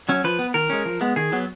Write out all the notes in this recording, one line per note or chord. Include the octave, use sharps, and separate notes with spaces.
F#3 C#4
F3 B4
B3
D#3 A#4
G#3 C#4
F3
G#3 B3
D#3 G#4
F#3 B3